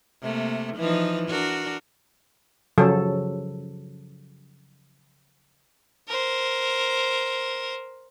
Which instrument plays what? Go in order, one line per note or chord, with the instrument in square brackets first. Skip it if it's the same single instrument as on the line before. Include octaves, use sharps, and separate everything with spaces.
[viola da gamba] C3 A3 A#3
E3 F3 D#4
D4 F#4 A#4
[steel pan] C#3 F3 F#3 A4
[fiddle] A#4 C5